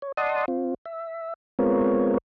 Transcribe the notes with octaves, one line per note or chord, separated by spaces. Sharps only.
C#5
D5 D#5 F#5 A5 C6 D#6
C4 F4
E5
G#3 B3 C4 F4 A#4 C#5